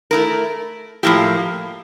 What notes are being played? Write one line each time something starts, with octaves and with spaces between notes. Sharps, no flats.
A3 E4 A#4
A2 F3 A#3 E4 G4